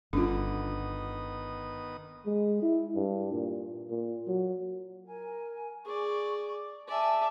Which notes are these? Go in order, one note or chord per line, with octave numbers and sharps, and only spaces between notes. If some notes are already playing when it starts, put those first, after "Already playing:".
G1 D3 D#3 B3 C#4 F4 D#6
G#3
E4
G2
A#2
A#2
F#3
A#4 G#5
G#4 D5 C#6
D5 E5 G#5 A5